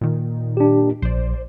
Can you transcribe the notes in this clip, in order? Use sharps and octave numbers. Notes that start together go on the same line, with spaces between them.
A#2 D#3
D4 G4
A#1 C5 D5